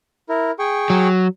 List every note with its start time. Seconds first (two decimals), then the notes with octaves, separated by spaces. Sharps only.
0.29 E4 A#4
0.59 G#4 G5 C#6
0.90 F#3